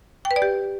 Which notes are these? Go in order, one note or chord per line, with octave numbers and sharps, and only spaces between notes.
G5
B4
D5
G4